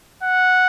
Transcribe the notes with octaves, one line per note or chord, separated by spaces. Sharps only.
F#5